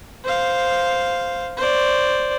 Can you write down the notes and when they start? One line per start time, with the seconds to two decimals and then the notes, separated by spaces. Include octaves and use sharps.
0.24 C5 F5
1.57 C5 D5